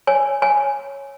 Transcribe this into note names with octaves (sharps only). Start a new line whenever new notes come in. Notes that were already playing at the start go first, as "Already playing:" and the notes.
C#5 G#5
C#5 G#5